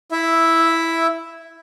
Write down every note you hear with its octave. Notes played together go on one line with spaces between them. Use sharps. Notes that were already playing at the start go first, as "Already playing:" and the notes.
E4 E5